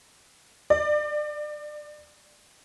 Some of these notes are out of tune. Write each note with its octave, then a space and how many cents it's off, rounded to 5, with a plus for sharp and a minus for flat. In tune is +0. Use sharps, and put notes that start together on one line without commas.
D5 +25